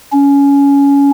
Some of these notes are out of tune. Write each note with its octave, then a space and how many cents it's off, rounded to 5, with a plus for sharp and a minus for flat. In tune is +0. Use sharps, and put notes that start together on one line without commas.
C#4 +20